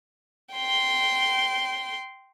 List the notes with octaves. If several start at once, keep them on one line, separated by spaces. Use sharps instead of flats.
G5 C6